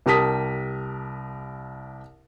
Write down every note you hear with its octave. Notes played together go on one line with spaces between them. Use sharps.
C2 G4 A#4 A5 D#6 B6